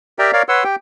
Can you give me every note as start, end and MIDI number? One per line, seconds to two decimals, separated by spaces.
0.19 0.31 67
0.19 0.31 70
0.19 0.31 74
0.19 0.31 76
0.19 0.31 79
0.19 0.31 82
0.33 0.43 70
0.33 0.43 73
0.33 0.43 74
0.33 0.43 77
0.49 0.64 71
0.49 0.64 73
0.49 0.64 78
0.49 0.64 84
0.49 0.64 88
0.64 0.76 67
0.64 0.76 79